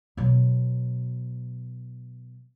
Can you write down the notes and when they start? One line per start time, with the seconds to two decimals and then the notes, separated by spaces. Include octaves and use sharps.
0.17 B2 F#3